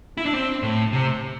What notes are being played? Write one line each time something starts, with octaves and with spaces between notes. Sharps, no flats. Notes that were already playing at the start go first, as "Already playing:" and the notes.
E4
D4
C4
A2
C3